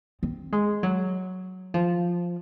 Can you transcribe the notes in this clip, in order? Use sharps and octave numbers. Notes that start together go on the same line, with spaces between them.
C4
G#3
F#3
F3